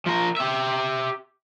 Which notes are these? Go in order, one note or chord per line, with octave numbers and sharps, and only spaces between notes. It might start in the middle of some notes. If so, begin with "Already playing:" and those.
F3 A#4
G4 E5